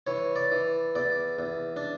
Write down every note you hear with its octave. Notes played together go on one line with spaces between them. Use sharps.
E3 C#5
D5
E3
E2 D5
E2
D4